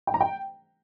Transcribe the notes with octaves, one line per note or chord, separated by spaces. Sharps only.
G5
A#5
G5